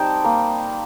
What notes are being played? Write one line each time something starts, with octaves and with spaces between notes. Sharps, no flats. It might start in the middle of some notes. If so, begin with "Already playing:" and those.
Already playing: G3 C4 D#4 G5 A5
A#3